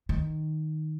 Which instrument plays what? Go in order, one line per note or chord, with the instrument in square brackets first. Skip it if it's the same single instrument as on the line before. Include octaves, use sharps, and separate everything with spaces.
[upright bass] D#3